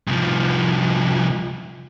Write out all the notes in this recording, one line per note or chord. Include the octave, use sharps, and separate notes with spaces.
C2 F3